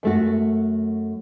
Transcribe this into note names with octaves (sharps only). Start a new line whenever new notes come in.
F#2 A3 F#4